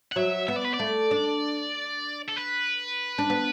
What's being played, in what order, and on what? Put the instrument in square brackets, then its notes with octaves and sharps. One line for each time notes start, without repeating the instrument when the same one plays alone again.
[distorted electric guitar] F#5
[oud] F#3 [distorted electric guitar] E5
[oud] B3 [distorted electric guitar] E5
[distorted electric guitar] D5
B4
D5
[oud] A3
D4
[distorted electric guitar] A4
B4
[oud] D4
B3